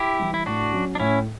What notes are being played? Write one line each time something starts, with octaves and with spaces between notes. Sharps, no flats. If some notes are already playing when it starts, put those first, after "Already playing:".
Already playing: E4 G4
E3 G3
E4
A2 D4 F#4
F#3 C#4
D4
A2 C#4 E4